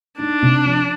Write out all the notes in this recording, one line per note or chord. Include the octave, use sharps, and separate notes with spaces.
D4 D#4
C3
F3